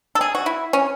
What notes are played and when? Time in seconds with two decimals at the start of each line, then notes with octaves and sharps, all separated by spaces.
0.15 A4
0.21 G#4
0.35 F#4
0.46 E4
0.73 C#4